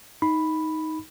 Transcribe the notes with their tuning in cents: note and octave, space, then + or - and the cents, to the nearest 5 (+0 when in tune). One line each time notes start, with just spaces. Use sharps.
D#4 +10 B5 +0